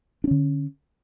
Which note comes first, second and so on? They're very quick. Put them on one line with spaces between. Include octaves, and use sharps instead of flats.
D4 C#4 D3